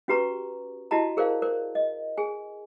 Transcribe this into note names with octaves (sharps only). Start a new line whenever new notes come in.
C#4 F#4 G4 B4 A#5 C#6
E4 F#4 G4 D#5 A5 A#5
G#4 A#4 C5 D5 F5
A#4 C5 D5
D#5
G#4 G#5